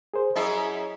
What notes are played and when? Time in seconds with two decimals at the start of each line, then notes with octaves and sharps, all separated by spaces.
0.14 G#4 A#4 C5
0.36 F#2 E4 G#4 D#5